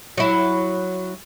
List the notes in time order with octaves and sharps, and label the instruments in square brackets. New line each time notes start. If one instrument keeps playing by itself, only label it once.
[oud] F#3 E4